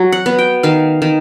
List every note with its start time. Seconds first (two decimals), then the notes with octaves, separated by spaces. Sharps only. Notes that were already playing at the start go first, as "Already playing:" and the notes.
Already playing: F#3
0.12 F#5
0.26 B3
0.39 G5
0.63 D#3 F5
1.02 D#3